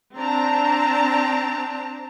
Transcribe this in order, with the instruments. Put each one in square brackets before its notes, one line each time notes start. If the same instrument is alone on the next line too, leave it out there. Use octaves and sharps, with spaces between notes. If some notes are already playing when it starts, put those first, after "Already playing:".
[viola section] C4 D4 A5 A#5